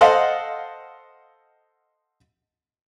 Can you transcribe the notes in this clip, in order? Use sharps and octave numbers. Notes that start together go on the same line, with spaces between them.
A4 C5 D#5 F5 F#5